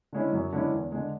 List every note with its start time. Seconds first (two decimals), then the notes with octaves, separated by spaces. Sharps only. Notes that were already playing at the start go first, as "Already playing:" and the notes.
0.13 D3 G#3 C#4 E4
0.33 F#2
0.52 D3 G#3 C#4 E4
0.73 E2
0.92 D3 G#3